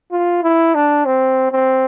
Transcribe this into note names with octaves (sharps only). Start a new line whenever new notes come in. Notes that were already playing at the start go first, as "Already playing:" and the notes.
F4
E4
D4
C4
C4